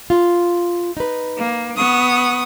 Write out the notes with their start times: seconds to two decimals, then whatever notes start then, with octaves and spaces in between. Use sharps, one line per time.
0.10 F4
0.97 D#4 B4
1.36 A#3
1.77 B3 C#6 D#6